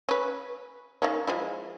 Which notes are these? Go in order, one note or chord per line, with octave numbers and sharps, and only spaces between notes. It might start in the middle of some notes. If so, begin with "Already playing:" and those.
C#4 B4
D#3 A#3 C#4
F3 G#3 E4